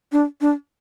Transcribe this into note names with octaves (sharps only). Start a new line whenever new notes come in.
D4
D4